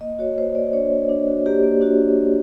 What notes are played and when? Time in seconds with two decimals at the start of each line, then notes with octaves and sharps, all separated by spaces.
0.01 A#3 D#5
0.19 F#4 C#5
0.38 A#3 C5
0.55 A#3 D5
0.73 D4 C#5
0.91 A#3
1.09 D4
1.28 F#4
1.46 A#3 G4
1.63 A#3
1.81 D4 F#4